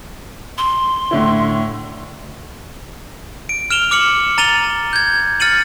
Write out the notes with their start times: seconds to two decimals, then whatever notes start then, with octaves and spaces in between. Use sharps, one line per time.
0.58 C6
1.11 A2 D3 E4
3.49 D7
3.70 F6 D7 E7 F7 G7
3.91 D6 F6 C#7 F#7
4.38 A#5 A6 D#7 F7 G7
4.93 G6 G#6
5.40 F6 A6 C#7 D#7 F#7